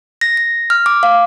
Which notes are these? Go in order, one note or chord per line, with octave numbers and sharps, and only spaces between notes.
A#6
A#6
F6
D6
F5